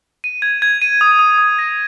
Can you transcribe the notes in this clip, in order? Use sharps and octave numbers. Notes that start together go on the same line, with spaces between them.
D#7
G#6
G#6
D#7
D#6
D#6
D#6
A#6